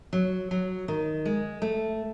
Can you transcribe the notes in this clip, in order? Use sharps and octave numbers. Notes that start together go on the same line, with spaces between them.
F#3
F#3
D#3
G#3
A3